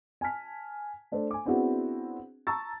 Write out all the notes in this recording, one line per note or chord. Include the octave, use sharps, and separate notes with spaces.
G#5 A5 F6 B6
A3 D4 A4 C5
G#5 D6
B3 C4 D4 E4 F#4 G#4
A5 A#5 C#6 E6 A6